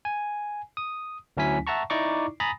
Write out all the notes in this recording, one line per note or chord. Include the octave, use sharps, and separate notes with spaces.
G#5
D#6
D2 F#3 C#4 E4 G#5 B6
E5 F#5 A5 A#5 C#6
D#4 E4 D5 A#5 C#6 D6
G#5 A#5 B5 D#6 A6 A#6